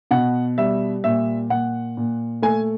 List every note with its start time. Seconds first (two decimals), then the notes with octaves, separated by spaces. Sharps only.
0.11 B2 F#5
0.58 G3 E5
1.04 A#2 E5
1.50 A#2 F#5
1.97 A#2
2.42 A3 G#5